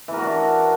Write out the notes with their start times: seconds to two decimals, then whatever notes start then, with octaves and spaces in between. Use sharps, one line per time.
0.08 E3
0.13 A#4
0.18 F#4
0.23 D4